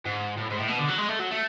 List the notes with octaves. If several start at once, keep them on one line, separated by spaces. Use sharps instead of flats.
G#2
A2
G#2
A2
B2
D3
F#3
G#3
A3
F#3
A3